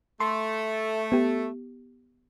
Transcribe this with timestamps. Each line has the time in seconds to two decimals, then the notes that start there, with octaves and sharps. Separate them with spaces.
0.20 A3 C6
1.12 B3 G4